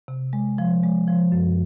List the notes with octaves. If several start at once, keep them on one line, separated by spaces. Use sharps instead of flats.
C3
G#3
F3
G#3
F3
F#2